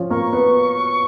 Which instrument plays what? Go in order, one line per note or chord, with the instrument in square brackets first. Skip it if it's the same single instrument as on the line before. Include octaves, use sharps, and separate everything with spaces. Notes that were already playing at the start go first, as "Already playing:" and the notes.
Already playing: [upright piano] F3 C#4 F4
[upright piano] A#3 A#4 [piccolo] C#6
[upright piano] B3 B4